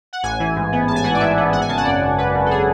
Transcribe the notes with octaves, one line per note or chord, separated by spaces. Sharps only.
F#5
A1 G#5
E3
G#2
B3
A1 A5
G#5
E3 F#5
D5
G#2 E5
B3
G#1 F#5
G#5
C#3 A5
F#5
F#2 D5
G#1
G#1 B4
C#3
A4
G#4